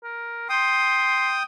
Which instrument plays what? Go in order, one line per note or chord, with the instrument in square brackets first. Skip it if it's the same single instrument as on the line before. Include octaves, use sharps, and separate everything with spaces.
[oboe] A#4
[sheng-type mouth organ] G5 D#6 [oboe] C6